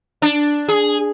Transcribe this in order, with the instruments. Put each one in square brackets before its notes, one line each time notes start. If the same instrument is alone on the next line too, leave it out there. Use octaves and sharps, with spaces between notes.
[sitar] D4
G#4